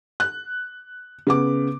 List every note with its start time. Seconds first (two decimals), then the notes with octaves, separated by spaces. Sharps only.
0.20 F#6
1.27 C#3 B3 D6